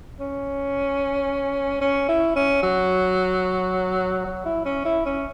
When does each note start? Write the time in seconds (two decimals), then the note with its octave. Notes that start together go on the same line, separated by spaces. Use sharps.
0.20 C#4
1.81 C#4
2.08 E4
2.36 C#4
2.63 F#3
4.26 F#3
4.45 E4
4.65 C#4
4.85 E4
5.06 C#4